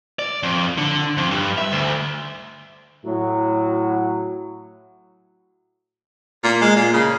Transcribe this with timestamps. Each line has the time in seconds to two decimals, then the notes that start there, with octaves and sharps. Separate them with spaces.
0.19 D5
0.43 F2
0.78 D3
1.17 F2
1.31 G2
1.58 E5
1.72 D2
3.05 A2 F#3
6.44 A#2
6.61 G#3
6.76 A#2
6.94 C#3